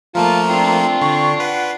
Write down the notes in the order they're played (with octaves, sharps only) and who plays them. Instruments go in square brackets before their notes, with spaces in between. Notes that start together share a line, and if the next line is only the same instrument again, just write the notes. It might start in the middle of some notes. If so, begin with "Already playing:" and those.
[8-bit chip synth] F3 A3 A#3 [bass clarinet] F4 [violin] A5 [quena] A#5
[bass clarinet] C4 [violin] D4 F4
[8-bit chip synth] D3 [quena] C#6
[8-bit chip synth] B4 [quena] F#5